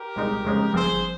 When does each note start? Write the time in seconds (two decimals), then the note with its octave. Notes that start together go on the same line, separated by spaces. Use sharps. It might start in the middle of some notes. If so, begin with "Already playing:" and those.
Already playing: G4 A#4
0.16 C2 A#2 G#3 D#4
0.45 F2 C#3 G#3 D#4
0.74 G1 G2 F3 C4 G#4 C5